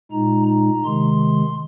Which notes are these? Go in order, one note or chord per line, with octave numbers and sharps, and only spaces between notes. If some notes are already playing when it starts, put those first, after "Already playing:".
A#2 G#3 D#4 A#5
A#5
C3 D#3 G#3 C6